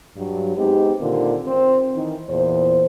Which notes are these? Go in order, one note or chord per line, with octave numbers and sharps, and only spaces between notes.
G2 F#3
G#3 B3 C4 D#4 G4
A#2 D3 D#3 A#3 C4 F4
C4
D#3 E3
E2 A#2 C5